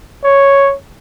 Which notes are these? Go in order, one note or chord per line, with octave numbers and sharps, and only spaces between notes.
C#5